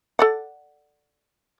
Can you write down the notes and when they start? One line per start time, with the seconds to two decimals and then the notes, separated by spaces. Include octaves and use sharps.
0.19 A4 D5 F#5